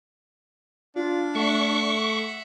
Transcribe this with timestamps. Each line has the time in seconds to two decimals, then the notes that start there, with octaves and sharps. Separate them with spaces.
0.96 D4 F4
1.35 A3 E5 F#5 C#6